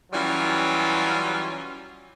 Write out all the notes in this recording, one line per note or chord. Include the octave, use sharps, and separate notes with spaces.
E3 F#3 G3 C#4 F4